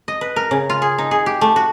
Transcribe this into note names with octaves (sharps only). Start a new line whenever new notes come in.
D#5
B4
A#4
C#3
F4
G#4
D#4
G#4
G4
A3
F#4